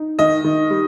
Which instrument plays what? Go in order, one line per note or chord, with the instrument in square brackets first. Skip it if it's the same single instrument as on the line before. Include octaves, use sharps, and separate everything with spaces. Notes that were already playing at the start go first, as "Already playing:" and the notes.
Already playing: [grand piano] D#4
[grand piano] D#3 [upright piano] D#5
[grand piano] D#3
G3